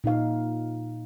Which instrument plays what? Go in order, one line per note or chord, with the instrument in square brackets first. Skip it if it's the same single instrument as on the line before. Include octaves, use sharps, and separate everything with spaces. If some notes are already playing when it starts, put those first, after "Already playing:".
[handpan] A#2 D#4 F5